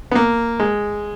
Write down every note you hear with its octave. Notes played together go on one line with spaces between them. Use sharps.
B3
A#3
G#3